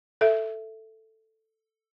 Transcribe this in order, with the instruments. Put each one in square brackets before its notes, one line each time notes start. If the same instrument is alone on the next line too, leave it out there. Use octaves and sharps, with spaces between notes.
[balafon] A4 E5